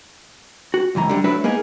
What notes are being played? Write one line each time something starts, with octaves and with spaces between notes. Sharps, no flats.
F#4
C#2 F#2 E3 A#5
D3 G3
F#3 A3 D4 E4 F#4 B4
A#3 B3 D#4 G#4